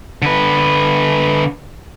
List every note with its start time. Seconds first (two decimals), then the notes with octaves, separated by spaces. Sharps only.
0.22 D3 B4